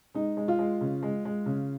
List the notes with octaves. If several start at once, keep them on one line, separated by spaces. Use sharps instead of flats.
G#3 D#4
G#3
F4
G#3
C#3
G#3
G#3
C#3